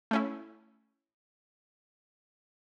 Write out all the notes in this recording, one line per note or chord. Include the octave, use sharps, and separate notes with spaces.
A3 C#4 E4